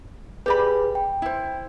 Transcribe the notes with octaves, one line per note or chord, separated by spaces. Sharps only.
G4 G#4 B4 D5 B5
G5
E4 C5